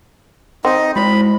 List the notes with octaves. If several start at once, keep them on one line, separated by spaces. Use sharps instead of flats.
C4 D#4 D#5
G#3 E4 C5 B5